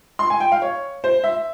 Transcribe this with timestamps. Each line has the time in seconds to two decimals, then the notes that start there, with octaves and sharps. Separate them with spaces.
0.19 C6
0.30 G#5
0.40 G5
0.52 F5
0.62 C#5
1.04 C5
1.24 E5